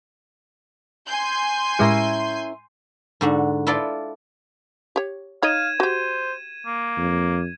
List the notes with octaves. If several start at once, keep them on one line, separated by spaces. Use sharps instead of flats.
G#5 C6 G6
A2 G#3 C#4 E4 G4 A#4
G#2 D3 F#4
E4 F4 A4 B4 D5 F5
G4 C#5
D#4 C#5 D#5 F5 G#6 D#7 E7
F#4 G4 C5
A#3
F2